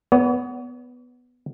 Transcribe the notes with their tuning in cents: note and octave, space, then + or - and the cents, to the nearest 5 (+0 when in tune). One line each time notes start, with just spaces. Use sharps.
B3 +5 C#5 +45